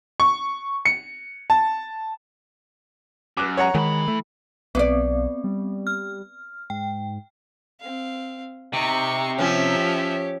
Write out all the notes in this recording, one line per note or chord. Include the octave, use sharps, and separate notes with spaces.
C#6
C#7
A5
F#2 D6 F#6
C#5 F#5 A#5
D#3 E3 G#3 B5
A3
B1 B3 C4 B4 D5
G3
F6
G#2 G5
C4 F5
C3 D#4 C#6
F3 C#4 G4 C#5 E5